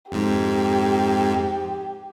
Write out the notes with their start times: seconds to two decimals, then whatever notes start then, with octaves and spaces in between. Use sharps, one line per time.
0.12 F2 G#2 G4